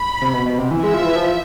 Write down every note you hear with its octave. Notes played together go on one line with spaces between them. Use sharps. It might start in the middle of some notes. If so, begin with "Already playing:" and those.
Already playing: B5
C3
B2
B2
C3
E3
G#3 E5
F3
E3
F3